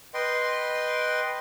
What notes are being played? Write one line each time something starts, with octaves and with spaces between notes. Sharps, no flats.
B4 D#5 G5 C6